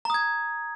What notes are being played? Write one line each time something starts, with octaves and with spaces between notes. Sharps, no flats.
A#5 D#6 G#6